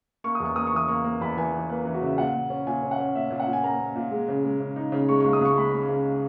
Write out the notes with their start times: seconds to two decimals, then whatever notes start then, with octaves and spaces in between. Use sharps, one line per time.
0.24 A#3 C#6
0.35 E2 D#6
0.45 C#6
0.56 A#3 D#6
0.67 C#6
0.73 E3 D#6
0.88 A#3 C#6
1.04 A#3
1.21 E2 B5
1.37 E3 G#5
1.54 E3
1.69 A#3 B4
1.85 E3
1.94 F#4
2.01 C#3 E5
2.18 A#2 F#5
2.34 A#2
2.50 C#4
2.67 A#2 G#5
2.83 C#4
2.91 F#5
2.99 C#4
3.15 A#2 E5
3.30 A#2
3.39 F#5
3.47 A#2
3.53 G#5
3.63 A#3 A#5
3.79 A#3
3.96 A#2
4.11 G#3
4.28 C#3
4.45 G#3
4.60 C#3
4.76 D#4
4.92 C#3
5.09 G#3 C#6
5.20 C#2 C#6
5.33 D#6
5.41 C#2 C#6
5.58 G#3 B5
5.74 G#3
5.89 C#3